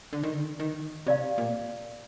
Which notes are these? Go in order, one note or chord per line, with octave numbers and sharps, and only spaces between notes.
D3
D#3
D3
D#3
C3 G4 D5 F5
A#2